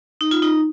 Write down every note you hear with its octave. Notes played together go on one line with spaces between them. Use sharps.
D#4
F4
D#4